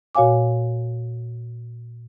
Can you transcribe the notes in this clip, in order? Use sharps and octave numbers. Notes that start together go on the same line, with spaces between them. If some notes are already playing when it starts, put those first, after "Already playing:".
A#2 F#4 C#5 F5 G#5 D6